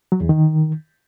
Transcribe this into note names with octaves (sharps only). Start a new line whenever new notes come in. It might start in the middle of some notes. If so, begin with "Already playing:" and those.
F#3
E2
D#3